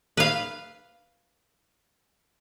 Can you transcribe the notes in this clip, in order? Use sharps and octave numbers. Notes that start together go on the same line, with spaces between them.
B4 F5